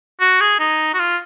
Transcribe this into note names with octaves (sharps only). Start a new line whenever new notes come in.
F#4
G#4
D#4
F#4
F4